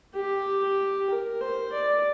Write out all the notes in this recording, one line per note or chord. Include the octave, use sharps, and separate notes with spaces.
G4
A#4
C5
D5